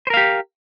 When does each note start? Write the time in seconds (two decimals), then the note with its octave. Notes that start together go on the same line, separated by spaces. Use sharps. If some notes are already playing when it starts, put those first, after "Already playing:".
0.07 C5
0.10 A#4
0.14 F5
0.17 G4